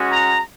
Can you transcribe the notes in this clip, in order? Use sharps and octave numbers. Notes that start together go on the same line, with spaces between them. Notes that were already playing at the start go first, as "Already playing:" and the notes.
Already playing: G#3 C#4 F#4
A#5